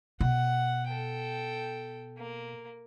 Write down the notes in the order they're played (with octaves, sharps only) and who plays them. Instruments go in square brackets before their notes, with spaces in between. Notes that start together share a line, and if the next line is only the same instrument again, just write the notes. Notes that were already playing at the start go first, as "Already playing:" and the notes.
[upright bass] B2 [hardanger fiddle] F#5
[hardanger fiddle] A4 G5
A#3